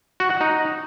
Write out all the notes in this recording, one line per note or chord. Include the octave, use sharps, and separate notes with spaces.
F#4
F#5
D#4